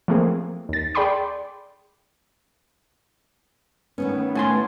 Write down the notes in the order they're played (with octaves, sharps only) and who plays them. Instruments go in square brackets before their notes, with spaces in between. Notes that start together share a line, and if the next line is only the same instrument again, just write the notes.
[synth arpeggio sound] F3 A3 A#3 C4 G#4
D#2 A6
G#4 D5 G5 B5 C6 D6
[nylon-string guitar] D#3 A3 C#4 [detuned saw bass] B3
[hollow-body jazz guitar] A2 G#5 C6